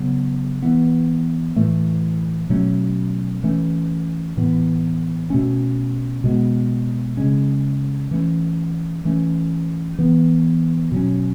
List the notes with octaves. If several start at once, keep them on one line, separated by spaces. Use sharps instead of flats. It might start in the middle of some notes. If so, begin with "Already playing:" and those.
Already playing: C#3 F#3 B3
E3 B3
A2 E3 A3
B2 F#3 A3 C#4
E3 A3 C#4
A2 E3 B3
B2 A3 C#4
B2 G#3 B3
C#3 G#3 C#4
E3 A3 C#4
E3 A3 C#4
E3 B3
B2 F#3 C#4